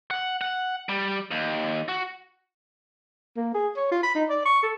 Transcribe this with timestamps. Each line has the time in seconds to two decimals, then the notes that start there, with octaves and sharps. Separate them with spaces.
0.11 F#5
0.41 F#5
0.89 G3
1.31 D#2
1.88 F#4
3.37 A#3
3.54 G#4
3.77 C#5
3.91 F4
4.03 B5
4.15 D#4
4.30 D5
4.46 C#6
4.63 A4